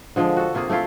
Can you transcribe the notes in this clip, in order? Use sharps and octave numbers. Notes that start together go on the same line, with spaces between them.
D3 F3 G#3
F#4 A4
C3 A#3 F4 G#4
A3 C4 E4 F4